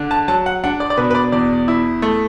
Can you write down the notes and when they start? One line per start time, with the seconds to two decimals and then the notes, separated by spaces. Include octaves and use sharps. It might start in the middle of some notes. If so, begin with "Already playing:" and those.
Already playing: D3 D4
0.11 A5
0.28 F#3 A5
0.46 F#5
0.64 D4 F#5
0.80 D5
0.90 D5
0.97 B2 B4
1.10 B4
1.15 D5
1.32 E2 D5
1.68 E4
2.02 A3